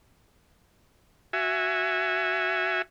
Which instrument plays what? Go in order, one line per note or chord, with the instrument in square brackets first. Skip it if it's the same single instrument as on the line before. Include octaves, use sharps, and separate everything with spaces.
[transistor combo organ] F#4 E5 G#5